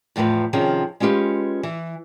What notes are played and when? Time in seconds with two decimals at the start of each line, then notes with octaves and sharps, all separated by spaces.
0.16 E2 A2 F3 G4 B4
0.53 C3 D#3 F3 C#4 G#4
1.00 G#3 C#4 F4 G4 B4
1.63 E3